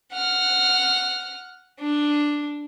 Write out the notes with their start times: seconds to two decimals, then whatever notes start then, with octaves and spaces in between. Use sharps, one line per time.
0.13 F#5 F6
1.80 D4